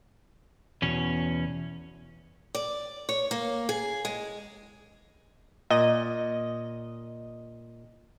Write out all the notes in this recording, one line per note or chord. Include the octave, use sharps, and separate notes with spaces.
E2 B2 C#4
D5
C#5
A#3
G#4
G#3
A#2 D#5